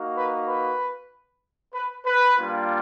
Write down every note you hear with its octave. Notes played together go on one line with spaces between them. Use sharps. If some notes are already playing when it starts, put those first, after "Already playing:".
Already playing: A#3 D#4 F#4
B4
B4
B4
B4
G3 A#3 D4 F4